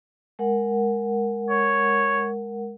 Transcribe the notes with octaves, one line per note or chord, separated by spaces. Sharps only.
G#3 A#4 F#5
C#5